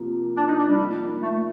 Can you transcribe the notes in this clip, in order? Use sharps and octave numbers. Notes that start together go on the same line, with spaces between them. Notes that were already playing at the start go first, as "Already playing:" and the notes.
Already playing: C3 F3 A#3
D4
D#4
D4
G3
F3 A#3 D#4
A3